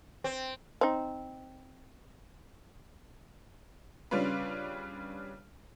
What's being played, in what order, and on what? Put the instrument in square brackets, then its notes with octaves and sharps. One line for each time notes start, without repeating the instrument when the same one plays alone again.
[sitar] C4
[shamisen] C4 D#4
[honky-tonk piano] C#3 G3 C#4 D4 F4 B4